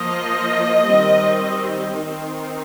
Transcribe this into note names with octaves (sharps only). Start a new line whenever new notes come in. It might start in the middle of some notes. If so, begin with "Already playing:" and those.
Already playing: F3 A#3 D#5
D#3 G3 C4
D#5
D#3 C4 D#4